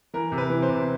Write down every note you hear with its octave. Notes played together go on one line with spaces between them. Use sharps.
E3 A#4
C3
B4
E3
C5
C3